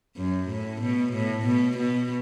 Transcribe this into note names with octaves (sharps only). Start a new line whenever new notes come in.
F#2
A2
B2
A2
B2
B2